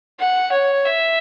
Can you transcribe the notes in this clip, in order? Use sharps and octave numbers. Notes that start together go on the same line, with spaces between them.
F#5
C#5
E5